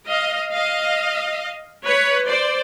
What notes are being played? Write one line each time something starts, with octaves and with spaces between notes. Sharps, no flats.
D#5 F5
D#5 F5
B4 C#5
C5 D5